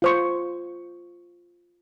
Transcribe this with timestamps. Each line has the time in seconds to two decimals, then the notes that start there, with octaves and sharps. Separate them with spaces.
0.02 F4 C5 C#6